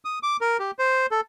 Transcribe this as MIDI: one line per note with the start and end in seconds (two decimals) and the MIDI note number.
0.05 0.19 87
0.23 0.37 86
0.41 0.57 70
0.60 0.71 67
0.79 1.06 72
1.11 1.21 69